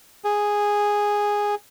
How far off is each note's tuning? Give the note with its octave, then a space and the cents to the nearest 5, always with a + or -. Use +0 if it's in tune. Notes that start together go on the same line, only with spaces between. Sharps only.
G#4 -5